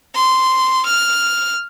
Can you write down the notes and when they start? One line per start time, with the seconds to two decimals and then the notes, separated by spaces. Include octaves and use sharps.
0.15 C6
0.86 F6